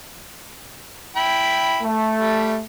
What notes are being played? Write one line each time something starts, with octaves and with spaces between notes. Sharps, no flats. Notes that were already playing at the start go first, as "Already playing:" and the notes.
E4 G5 B5
A3
G3